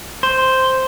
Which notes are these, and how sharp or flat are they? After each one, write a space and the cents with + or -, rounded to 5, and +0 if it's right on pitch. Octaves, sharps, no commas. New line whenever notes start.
C5 +0